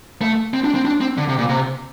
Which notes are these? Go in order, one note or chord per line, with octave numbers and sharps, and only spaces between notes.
A3
C4
D4
C4
D4
C4
D3
C3
A#2
C3